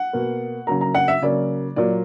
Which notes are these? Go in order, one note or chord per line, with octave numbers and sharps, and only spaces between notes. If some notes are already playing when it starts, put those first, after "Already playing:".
Already playing: F#5
B2 A#3
C#3 F#3 A#3 A#5
A#5
F#5
E5
C#3 F#3 A#3 D5
A#2 F#3 A#3 D5